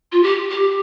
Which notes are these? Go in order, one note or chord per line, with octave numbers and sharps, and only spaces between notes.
F4
G4
G4